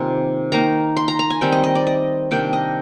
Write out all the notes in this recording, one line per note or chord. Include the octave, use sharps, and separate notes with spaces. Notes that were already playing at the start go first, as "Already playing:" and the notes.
Already playing: C3 D#3 A#3 F4 G#5
D#3 A#3 D#4 A#5
C6
A#5
A#5
G#5
D#3 G3 C4 G5
D#5
D#5
D5
D#5
C3 D#3 A#3 D4 G5
D#5